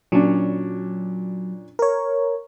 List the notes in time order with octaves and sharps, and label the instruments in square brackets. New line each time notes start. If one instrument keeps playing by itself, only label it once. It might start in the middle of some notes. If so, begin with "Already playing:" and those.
[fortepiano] A#2 C#4 D4 [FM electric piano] F#3
[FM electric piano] A#4 C#5